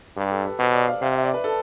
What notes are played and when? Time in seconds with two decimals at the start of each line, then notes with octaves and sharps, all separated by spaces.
0.17 G2 G4
0.31 A4
0.45 B4
0.59 B2 C5
0.73 D5
0.88 F5
1.02 C3 F5
1.13 E5
1.23 D5
1.34 B4
1.44 A4